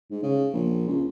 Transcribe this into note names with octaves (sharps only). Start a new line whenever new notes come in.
G#2
C#3
A#1
C#2